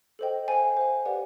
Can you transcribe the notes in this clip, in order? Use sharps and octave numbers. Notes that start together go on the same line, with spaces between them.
A4 C5 D#5 G5
C5 F5 G#5
C5 F5
G4 B4 D5 F#5